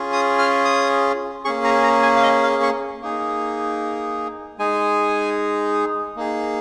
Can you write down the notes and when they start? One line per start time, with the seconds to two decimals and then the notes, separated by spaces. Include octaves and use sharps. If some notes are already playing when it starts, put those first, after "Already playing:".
Already playing: C#4 F4 G#4
0.13 D#6
0.39 F6
0.65 D#6
1.45 A#3 C#4 G#4 C#6
1.64 A#5
1.84 A#5
2.03 G#5
2.16 F5
2.23 D#5
2.43 F5
2.63 C#6
3.02 A#3 D#4 G#4
4.59 G#3 D#4 G#4 G#5
6.16 A#3 D#4 G#4